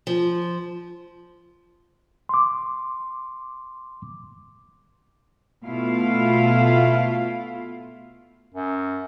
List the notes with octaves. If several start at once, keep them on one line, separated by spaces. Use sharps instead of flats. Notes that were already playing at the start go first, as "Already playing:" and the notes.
F3
C6 D6
B2 A3 E4 F4 F5
F#2